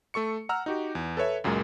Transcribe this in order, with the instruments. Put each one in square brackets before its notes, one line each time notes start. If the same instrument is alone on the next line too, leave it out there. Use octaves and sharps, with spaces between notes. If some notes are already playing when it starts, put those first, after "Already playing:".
[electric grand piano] A3 A4 C#6 C#7
F#5 A#5 E6 F6
D#4 F#4 G4
E2
A4 B4 C#5 E5
C#2 F#2 A#2 G#3 A#3